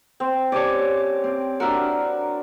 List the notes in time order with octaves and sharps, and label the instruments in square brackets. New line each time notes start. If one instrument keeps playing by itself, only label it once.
[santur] C4
[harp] C#4 G4 C#5 [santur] D5 A5
[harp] C4
[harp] D4 E4 F#4 [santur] A#4